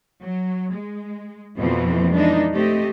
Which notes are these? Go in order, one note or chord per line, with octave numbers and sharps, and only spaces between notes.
F#3
G#3
F2 B2 E3 F3 A#3 C4
E3 G#3 D4 D#4
A3 C4 G4 D#5